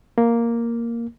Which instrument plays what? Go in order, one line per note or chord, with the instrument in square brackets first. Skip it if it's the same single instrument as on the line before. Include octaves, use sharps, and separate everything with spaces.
[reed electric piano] A#3